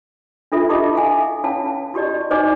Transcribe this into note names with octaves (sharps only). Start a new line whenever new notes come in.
D4 F4 A4 E5
E4 G4 A4 D#5 D6
E5 F5 G#5
C#4 E4 C#5 F5 A5
E4 F#4 G4 D5 D#5
D#4 C5 D5 D#5 G#5 D6